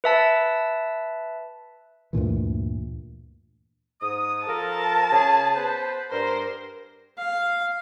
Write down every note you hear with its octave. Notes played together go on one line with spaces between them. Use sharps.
B4 E5 A5
D2 G2 A#2 E3
G#2 D#6
F3 A4 A#4 A5
C#3 G#4
B3 B4 C5
G2 A#4 C5
F5